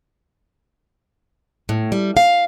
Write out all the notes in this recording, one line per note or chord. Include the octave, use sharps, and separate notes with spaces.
A2
G3
F5